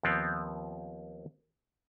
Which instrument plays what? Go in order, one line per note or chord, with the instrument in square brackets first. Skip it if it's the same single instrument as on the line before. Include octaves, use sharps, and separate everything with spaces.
[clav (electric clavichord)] D#2 F3 B3 C4